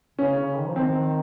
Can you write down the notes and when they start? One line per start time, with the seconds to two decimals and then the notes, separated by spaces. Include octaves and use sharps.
0.18 C#3 C#4
0.37 C#3
0.57 D#3
0.66 F3
0.76 D#3 C4